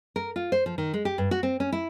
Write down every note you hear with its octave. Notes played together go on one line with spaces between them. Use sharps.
A#4
F4
C5
F3
D#3
G#3
G4
G2
F#4
C4
C#4
E4